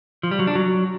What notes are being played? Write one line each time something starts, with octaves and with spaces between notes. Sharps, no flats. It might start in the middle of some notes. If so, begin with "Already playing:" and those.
F3
G3
F#3
D4
F#3